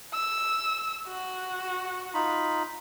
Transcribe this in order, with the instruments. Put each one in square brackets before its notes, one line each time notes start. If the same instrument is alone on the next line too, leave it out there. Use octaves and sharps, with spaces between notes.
[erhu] E6
F#4
[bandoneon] D#4 F4 B5